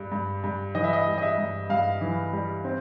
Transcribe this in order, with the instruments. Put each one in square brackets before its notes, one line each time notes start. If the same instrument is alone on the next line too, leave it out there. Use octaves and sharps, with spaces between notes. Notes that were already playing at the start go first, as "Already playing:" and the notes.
Already playing: [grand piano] G2 G3
G2
G2
E3 D#5
E5
D#5
G3
D#5
E5
G2
G2 F5
E3
G3
C4